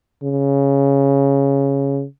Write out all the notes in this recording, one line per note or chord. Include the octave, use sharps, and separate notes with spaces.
C#3